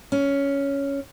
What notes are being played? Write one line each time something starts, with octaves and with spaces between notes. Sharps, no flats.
C#4